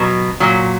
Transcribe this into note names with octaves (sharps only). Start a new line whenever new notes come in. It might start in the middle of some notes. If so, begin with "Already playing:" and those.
Already playing: B2 F#3
A#2 F#3